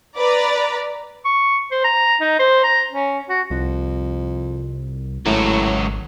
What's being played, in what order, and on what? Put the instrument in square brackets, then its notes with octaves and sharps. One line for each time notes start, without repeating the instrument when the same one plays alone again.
[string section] B4 D5 A#5
[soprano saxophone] C#6
C5
A#5
D#4
C5
A#5
C#4
F#4
[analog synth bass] C2 [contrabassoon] F2
[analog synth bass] G#1 [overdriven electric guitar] C#2 F#3 [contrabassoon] A2